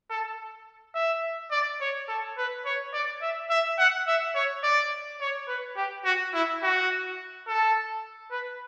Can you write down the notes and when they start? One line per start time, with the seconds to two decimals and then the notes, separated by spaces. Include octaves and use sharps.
0.10 A4
0.95 E5
1.52 D5
1.81 C#5
2.08 A4
2.38 B4
2.66 C#5
2.93 D5
3.22 E5
3.50 E5
3.79 F#5
4.08 E5
4.35 C#5
4.64 D5
5.21 C#5
5.48 B4
5.77 G4
6.05 F#4
6.34 E4
6.63 F#4
7.48 A4
8.32 B4